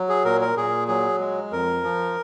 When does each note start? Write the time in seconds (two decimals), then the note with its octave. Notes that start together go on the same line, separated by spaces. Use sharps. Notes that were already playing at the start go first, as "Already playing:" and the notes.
Already playing: F#3
0.09 G#4
0.25 A#2 A#4
0.41 A#4
0.56 A#2 G#4
0.88 F#3 G#4
1.20 G#3
1.52 F2 A#4
1.83 F3